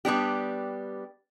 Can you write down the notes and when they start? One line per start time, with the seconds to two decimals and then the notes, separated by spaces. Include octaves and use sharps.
0.05 G3 B3 D4 G4